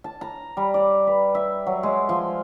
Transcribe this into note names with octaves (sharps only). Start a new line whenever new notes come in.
A5
A#5
G3
D5
B4
E5
F#3
G#3
F3